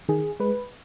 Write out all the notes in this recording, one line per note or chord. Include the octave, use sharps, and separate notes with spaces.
D#3 G#4
G#3 B4